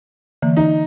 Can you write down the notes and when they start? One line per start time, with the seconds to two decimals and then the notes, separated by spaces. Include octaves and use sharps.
0.42 D3 E3 A#3
0.57 D#4